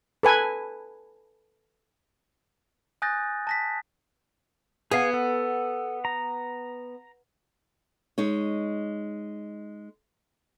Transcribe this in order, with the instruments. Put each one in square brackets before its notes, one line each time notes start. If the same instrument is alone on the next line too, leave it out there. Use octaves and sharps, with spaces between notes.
[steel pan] A4 B4 G#5
[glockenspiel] G#5 D#6 F#6 G6 A6 A#6
A5 A#6 B6
[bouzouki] B3 [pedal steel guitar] G#4 F5 G#5
[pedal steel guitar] A4
A#5
[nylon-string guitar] G#3 D#4 C#5